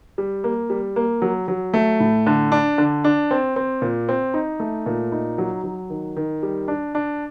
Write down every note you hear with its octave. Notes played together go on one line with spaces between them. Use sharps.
G3
A#3
G3
A#3
F#3
F#3
A3
A2
D3
D4
D3
D4
C4
C4
A#2
C4
D#4
A3
A#2
D#4
F#3
F#3
D#3
D#3
G3
D4
D4